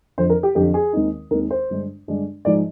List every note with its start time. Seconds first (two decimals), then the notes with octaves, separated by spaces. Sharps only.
0.18 F2 D3 F3 C5
0.30 A#4
0.43 G4
0.55 F2 D3 F3 G4
0.74 G#4
0.93 D#2 D#3 G#3 C4 D#4
1.31 D#2 D#3 G#3 C4 D#4 A#4
1.51 C5
1.70 G2 D3 G#3 D4
2.08 G2 D3 G#3 D4
2.45 G#2 F3 G#3 D#4 D5